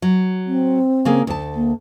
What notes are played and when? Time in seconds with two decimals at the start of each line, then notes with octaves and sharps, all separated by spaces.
0.02 F#3
0.47 C4
1.05 C#3 A#3 G#4
1.27 D2 A5
1.56 A#3